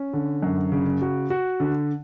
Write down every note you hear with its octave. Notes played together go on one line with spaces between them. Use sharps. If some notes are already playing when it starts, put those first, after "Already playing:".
Already playing: C#4
D3
F#2
C#3
F#4
F#4
D3